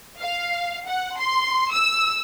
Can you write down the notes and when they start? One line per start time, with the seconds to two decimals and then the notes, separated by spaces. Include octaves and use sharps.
0.19 F5
0.87 F#5
1.18 C6
1.72 E6